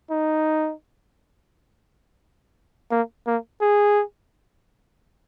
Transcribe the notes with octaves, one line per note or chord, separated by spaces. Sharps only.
D#4
A#3
A#3
G#4